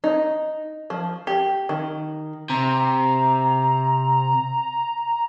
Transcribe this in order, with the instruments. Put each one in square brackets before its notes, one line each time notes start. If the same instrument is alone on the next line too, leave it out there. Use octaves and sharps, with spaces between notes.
[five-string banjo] D#4
F3
G4
D#3
[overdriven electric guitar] C3 [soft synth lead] A#5